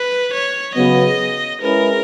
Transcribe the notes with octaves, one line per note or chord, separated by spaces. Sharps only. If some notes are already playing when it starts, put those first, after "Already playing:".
Already playing: B4
C#5
C#3 F#3 B3 D#5
G#3 C#4 E4 G#4 A#4 B4